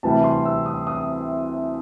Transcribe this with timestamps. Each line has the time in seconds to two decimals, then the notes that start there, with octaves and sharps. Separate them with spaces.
0.03 D2 C3 E3 G3 A5
0.24 C6
0.46 E6
0.66 D#6
0.87 D#6